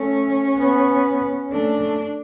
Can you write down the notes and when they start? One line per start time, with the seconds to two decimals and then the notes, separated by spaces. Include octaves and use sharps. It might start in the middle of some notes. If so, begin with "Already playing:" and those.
Already playing: A3 C#4
0.58 B3
1.52 A3 D4